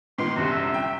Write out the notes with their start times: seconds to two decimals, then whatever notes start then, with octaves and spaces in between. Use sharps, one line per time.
0.18 A#2 D#3 B3 C6
0.36 G1 C2 F#2 F#4
0.51 E5
0.74 G5